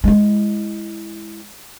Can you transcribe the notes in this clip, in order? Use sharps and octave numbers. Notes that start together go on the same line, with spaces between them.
G#3 E4